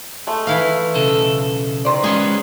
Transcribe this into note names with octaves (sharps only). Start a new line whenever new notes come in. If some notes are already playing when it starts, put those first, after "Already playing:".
G#3 A3
E3 E4 F5
B1 C#3 A4
D#3 C5 D5
G#3 C#4 G#4 B4